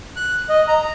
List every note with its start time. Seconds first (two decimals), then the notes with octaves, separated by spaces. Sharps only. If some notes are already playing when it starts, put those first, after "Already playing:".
0.16 F#6
0.49 D#5
0.68 A#5